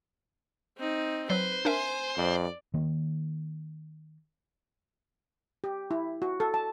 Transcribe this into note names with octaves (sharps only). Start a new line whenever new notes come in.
C4 D#4
F#3 B4 C5
D4 A#4 E5 G#5 C6
F2 D5
D#3 A#3
G4
E4
F#4
A4
A5